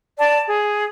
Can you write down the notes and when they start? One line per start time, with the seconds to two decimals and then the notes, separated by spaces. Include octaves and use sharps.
0.19 D5 A5
0.47 G#4